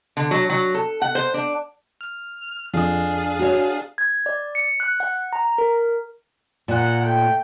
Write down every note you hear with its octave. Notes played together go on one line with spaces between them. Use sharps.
D3
F#3
F#3
A4
F#5
C5
D4
F6
F2 D4 G#4 F5 D#6
F#4 C#5
G#6
D5
C#7
F#6
F#5
A#5
A#4
A#2 A#4 F#5
A3 G5